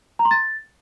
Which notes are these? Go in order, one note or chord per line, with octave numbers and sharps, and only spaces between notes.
A#5
C6
A6